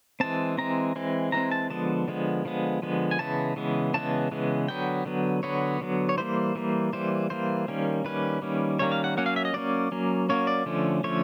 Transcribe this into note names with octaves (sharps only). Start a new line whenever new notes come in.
E3 G#3 C4 A5
E3 G#3 C4 A#5
E3 G#3 C4
E3 G#3 C4 A#5
A5
D3 F3 G#3 B3 A5
D3 F3 G#3 B3
D3 F3 G#3 B3
D3 F3 G#3 B3
G#5
C#3 E3 G#3 B3 A5
C#3 E3 G#3 B3
C#3 E3 G#3 B3 A5
C#3 E3 G#3 B3
D3 F#3 B3 G5
D3 F#3 B3
D3 F#3 B3 C#5
D3 F#3 B3
C#5
E3 G3 A#3 C5
E3 G3 A#3
E3 G3 A#3 C5
E3 G3 A#3 C5
D#3 G3 A#3 C#4
D#3 G3 A#3 C#4 B4
D#3 G3 A#3 C#4
D#3 G3 A#3 C#4 C#5
F5
F#5
F#3 A#3 C#4 F#5
F5
E5
D#5
F#3 A#3 C#4 D5
F#3 A#3 C#4
F#3 A#3 C#4 C#5
D5
D3 F3 A3 C#4
D3 F3 A3 C#4 C#5